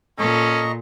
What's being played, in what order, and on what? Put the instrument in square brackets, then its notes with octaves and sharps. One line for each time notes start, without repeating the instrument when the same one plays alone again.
[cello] A#2 [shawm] C#4 [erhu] A4 [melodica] D#5 A#5 C#6